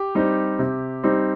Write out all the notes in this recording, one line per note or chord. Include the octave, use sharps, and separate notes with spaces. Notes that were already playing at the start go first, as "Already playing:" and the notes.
Already playing: G4
G3 C4 D#4
C3
G3 C4 D#4